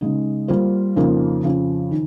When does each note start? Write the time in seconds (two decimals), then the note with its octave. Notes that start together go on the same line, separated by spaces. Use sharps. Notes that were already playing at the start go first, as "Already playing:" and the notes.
0.01 C#3 G#3 D#4
0.48 G3 A#3 F4 C5
0.96 F2 C#3 F3 A#3 D#4
1.44 F2 C#3 F3
1.91 D#3